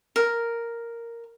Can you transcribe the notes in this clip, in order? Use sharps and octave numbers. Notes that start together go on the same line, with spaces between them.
A#4